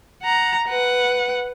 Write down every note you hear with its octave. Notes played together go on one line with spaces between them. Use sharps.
F#5 A#5
B4 F#5